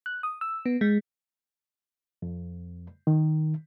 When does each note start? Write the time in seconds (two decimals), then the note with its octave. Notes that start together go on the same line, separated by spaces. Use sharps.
0.06 F#6
0.23 D#6
0.41 E6
0.66 B3
0.81 G#3
2.22 F2
3.07 D#3